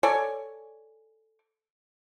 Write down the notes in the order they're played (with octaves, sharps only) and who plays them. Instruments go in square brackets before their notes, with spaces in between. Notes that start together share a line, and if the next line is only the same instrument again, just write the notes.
[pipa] A4 C#5 D5 G#5